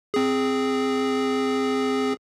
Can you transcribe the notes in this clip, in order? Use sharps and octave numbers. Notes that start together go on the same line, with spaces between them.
C4 G#4